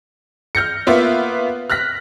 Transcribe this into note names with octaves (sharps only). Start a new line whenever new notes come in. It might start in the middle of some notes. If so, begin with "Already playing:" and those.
F6 G6 A#6 C#7
A#3 B3 F4 E5
F6 F#6 A#6 B6